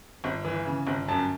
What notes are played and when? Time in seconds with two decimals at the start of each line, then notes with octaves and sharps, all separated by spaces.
0.24 G1
0.45 E3
0.65 C#3
0.87 G1
1.08 F#2 A5